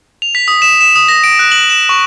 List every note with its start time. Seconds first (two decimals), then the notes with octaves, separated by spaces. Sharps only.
0.22 F7
0.35 B6
0.48 D#6
0.62 E7
0.81 E7
0.96 D#6
1.09 A#6
1.24 D7
1.39 F#6
1.52 F#7
1.69 E7
1.89 C#6